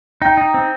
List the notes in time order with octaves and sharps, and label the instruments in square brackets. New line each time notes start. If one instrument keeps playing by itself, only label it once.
[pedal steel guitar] D#4 [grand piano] G5
[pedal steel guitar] D#4
C4